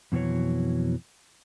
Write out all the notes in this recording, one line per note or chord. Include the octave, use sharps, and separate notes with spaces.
F2 B2 E3 F#3 C#5